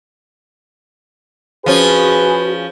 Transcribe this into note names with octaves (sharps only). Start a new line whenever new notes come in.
F3 C#4 F#4 G#4 B4